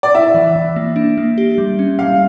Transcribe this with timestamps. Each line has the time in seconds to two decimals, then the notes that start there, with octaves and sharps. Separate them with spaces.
0.03 D5
0.15 E4 E5
0.34 E3
0.56 E3
0.76 A#3
0.96 D4
1.17 A#3
1.38 G4
1.58 G3
1.79 C#4
1.99 G3 F5